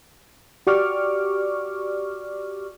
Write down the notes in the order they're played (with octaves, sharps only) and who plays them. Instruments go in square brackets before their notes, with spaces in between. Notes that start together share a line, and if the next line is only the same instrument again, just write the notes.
[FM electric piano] F#4 G4 D5 C#6 D6 F6